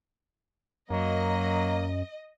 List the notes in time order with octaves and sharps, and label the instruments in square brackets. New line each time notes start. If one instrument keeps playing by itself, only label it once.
[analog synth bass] F#2 [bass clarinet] F#3 [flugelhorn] A#3 [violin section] D#5